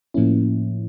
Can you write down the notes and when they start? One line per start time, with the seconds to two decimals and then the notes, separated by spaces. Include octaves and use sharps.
0.14 A2 F3 A#3 C#4 E4